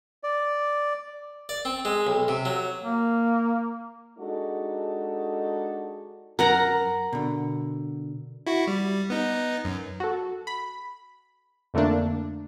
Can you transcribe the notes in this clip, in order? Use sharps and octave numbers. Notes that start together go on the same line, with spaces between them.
D5
D5
C4
G#3
B1
C3
F#3
A#3
G#3 D4 D#4 F#4 G4 A4
F#2 A#4 F#5 A#5
B2 D3
E4 F#4
G3
B3 D#4
F#2
F#4 A4
B5
F2 D3 A3 A#3 D4